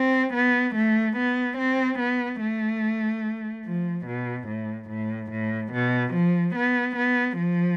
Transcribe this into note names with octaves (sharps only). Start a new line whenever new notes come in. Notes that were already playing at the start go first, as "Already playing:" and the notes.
Already playing: C4
B3
A3
B3
C4
B3
A3
F3
B2
A2
A2
A2
B2
F3
B3
B3
F3